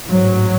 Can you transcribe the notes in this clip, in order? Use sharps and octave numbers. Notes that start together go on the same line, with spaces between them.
A1 G#2 F#3